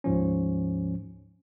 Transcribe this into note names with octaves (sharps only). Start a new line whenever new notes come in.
D2 G#2 F3 C#4